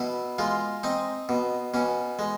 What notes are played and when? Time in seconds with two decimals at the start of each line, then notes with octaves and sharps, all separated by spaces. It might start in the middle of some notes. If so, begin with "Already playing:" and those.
Already playing: B2 E4
0.38 G#3 F4
0.83 C4 D#4
1.29 B2
1.74 B2 C#4
2.19 G#3